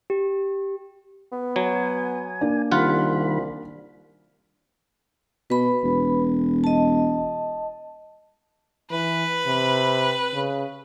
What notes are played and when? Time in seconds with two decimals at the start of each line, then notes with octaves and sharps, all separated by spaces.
0.10 G4
1.32 B3
1.56 F#3 G#5
2.41 A#3 D4
2.72 C2 D#3 G3 F4 F#5 B5
5.50 B2 B4 B5
5.84 E1
6.64 D#5 A5
8.91 E3 B4
9.47 C3
10.34 C#3